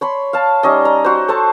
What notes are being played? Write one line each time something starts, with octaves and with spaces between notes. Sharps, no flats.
C#5 B5 C6
F5 A5
G3 C#4 D#4 D#5
A#5
F#4 C5
A4 C5 A5 C#6